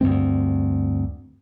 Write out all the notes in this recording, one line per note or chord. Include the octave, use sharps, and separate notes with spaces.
D2 G2 G#3 C4